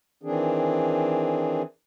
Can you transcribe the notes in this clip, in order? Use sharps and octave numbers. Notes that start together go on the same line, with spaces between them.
D#3 E3 C4 D4 G#4